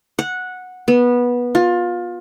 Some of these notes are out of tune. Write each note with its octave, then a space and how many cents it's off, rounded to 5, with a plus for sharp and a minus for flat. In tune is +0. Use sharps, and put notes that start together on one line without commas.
F#5 -10
B3 -15
F4 +25